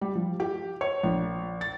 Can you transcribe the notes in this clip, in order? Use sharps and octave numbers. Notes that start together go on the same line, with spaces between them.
G3
F3
G4
C#5
A#1
A6